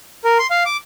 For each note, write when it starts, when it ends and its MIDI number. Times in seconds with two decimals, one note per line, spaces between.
0.24 0.38 70
0.39 0.47 84
0.51 0.64 77
0.66 0.77 86